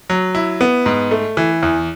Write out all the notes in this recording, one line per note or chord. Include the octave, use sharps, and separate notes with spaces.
F#3
E4
B3
G#2
A3
E3
E2